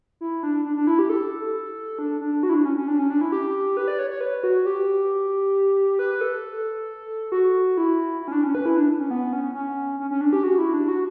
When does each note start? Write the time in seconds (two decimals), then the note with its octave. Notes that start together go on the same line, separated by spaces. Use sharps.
0.21 E4
0.43 D4
0.65 D4
0.76 D4
0.87 E4
0.99 G4
1.10 A4
1.99 D4
2.21 D4
2.43 F#4
2.49 E4
2.54 D4
2.65 C#4
2.77 C#4
2.88 D4
2.99 C#4
3.10 D4
3.21 E4
3.32 G4
3.77 B4
3.88 D5
3.99 C#5
4.10 C#5
4.21 B4
4.44 F#4
4.66 G4
5.99 B4
6.21 A4
7.32 F#4
7.77 E4
8.22 E4
8.28 C#4
8.32 D4
8.44 C#4
8.55 B4
8.66 E4
8.77 D4
8.99 C#4
9.11 B3
9.33 C#4
9.55 C#4
10.00 C#4
10.11 C#4
10.21 D4
10.33 G4
10.44 F#4
10.58 E4
10.73 D4
10.88 F#4